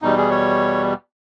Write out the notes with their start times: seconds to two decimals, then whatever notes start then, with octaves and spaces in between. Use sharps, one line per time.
0.02 E2 B2 G3 D#4
0.17 G#4
0.31 C#5